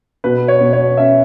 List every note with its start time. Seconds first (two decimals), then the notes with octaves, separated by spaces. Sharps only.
0.24 B2 B4
0.48 C#5
0.61 B2
0.73 C#5
0.97 C#4 E5